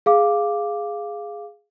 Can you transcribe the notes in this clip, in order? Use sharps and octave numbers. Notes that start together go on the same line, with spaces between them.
G#4 F5 D6